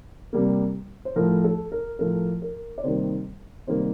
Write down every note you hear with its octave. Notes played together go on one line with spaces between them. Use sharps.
C3 G3 A#3
C5
A2 F3 A3 A#4
A4
A#4
A2 F3 A3 A#4
A#4
D5
C3 D#3 G3 A#3 C5
C3 D#3 G3 A#3 C5